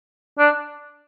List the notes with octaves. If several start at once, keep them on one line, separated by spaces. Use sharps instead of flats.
D4